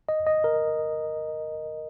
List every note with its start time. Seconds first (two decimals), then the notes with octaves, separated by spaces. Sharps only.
0.09 D#5
0.27 D#5
0.44 A#4